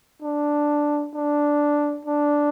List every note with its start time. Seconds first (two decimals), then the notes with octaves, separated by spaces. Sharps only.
0.22 D4
1.14 D4
2.05 D4